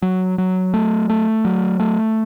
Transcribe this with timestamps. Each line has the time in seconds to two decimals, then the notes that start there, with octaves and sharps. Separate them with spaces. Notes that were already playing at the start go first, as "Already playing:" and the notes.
0.02 F#3
0.38 F#3
0.74 A3
1.09 A3
1.45 F#3
1.80 A3